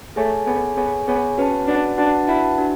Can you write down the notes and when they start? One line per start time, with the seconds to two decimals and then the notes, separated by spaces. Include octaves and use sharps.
0.16 A3 G#4 C#5 G#5
0.46 B3 G#4 C#5 G#5
0.77 B3 G#4 C#5 G#5
1.07 B3 G#4 C#5 G#5
1.38 C#4 F#4 B4 F#5 A5
1.67 D4 F#4 B4 F#5 A5
1.98 D4 F#4 B4 F#5 A5
2.28 E4 F#4 B4 F#5 A5
2.58 D4 F#4